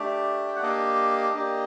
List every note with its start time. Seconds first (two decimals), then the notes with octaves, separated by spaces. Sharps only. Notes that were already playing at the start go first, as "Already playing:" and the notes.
Already playing: A3 D4 G4 D5
0.48 G5
0.56 F#5
0.62 A#3 D4 G4 D#5
1.34 A#3 D4 G4